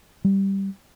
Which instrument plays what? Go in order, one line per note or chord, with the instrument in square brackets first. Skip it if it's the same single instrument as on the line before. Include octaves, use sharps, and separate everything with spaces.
[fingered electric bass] G3